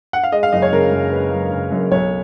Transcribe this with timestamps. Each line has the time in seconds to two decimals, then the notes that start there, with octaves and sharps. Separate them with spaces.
0.13 F#5
0.24 F5
0.32 G#3 D#5
0.43 F5
0.52 F#1 D#5
0.62 C#5
0.72 C#3 A#4
0.92 F#2
1.12 G#3 B4
1.32 F#1
1.51 C#3
1.72 F#2
1.91 B1 C#5